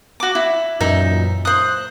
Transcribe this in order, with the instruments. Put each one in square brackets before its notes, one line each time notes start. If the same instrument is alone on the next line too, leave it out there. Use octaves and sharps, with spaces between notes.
[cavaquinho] F#4 D6
E4
[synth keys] F#2 A#2 E3 [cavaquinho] D#4 E5
[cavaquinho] C5 D#6 [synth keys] F#6